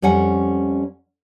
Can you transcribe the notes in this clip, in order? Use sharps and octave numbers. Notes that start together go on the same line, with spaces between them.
F2 G3 C#4 F#5 G#5